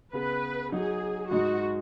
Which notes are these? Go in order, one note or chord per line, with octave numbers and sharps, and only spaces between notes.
C#3 B3 G#4 B4
F#3 D#4 F#4 G#4
G#2 G#3 D#4 F#4